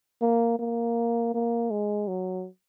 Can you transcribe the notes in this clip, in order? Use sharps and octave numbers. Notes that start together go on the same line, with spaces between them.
A#3
A#3
A#3
G#3
F#3